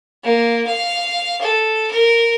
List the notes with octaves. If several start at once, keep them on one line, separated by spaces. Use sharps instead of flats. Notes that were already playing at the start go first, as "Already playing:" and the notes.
A#3
F5
A4
A#4